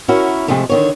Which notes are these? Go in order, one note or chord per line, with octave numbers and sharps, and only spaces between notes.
C#4 E4 F#4 A#4
C3 F3 G#3 A3
D3 D#3 C#5